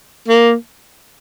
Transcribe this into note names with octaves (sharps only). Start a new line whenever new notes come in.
A#3